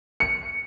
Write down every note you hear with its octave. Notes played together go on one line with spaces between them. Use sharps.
C#7